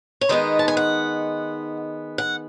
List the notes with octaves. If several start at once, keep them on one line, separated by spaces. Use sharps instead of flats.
C#5
D#3 G#3 B3 D#4 D#5
A5
G#5
F#5
F#5